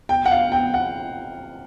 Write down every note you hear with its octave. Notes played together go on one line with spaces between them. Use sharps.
G5
F#5
F5
G5
F#5